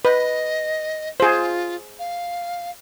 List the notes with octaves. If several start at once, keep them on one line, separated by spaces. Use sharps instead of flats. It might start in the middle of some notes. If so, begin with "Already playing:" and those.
B4 D#5
F4 G#4 C5
F5